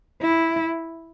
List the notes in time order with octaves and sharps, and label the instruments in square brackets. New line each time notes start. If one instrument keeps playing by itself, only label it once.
[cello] E4